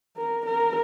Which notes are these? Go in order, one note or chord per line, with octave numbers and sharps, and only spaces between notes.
A#4
A#4